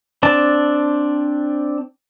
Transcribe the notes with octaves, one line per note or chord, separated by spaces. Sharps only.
C4 D4 A5